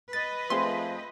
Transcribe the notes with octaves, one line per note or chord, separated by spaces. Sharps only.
B4 D#5 A6
F3 A3 C4 G#4 C6